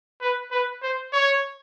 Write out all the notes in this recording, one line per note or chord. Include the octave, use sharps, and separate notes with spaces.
B4
B4
C5
C#5